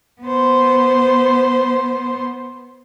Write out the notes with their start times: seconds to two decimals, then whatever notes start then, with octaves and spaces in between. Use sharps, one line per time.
0.22 B3 C5